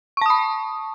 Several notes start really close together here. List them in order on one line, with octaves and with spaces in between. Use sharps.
C#6 A5 D#6 B5